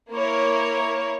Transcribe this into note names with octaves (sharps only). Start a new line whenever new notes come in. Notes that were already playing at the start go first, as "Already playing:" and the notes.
A#3 E4 A#4 C#5